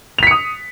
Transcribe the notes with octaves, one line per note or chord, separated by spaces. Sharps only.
D#6 B6 C#7 F7